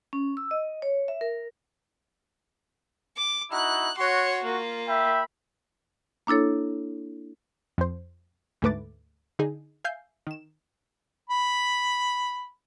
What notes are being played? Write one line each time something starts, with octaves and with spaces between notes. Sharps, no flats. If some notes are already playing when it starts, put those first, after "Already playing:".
C#4
E6
D#5
C#5
E5
A#4
D6
D#4 E4 F#4 F#6
F#4 C#5 C6
A#3 F4
E5 G5 B5
A#3 D4 E4 A4 C#5
F2 C5
D2 G#2 A3 B4 D6 A6
D3 D#4 G#4
E5 F5 G#5 G6 C7
D#3 E7
B5